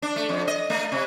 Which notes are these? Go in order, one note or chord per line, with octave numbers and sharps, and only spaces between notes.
D4
A3
F2
D#5
A3
C3